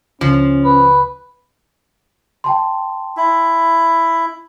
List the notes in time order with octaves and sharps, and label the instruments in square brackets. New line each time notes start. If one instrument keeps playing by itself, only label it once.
[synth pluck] C#2 [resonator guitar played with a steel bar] F3 [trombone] C#4
[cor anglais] B4
[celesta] G5 A5 C6
[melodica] E4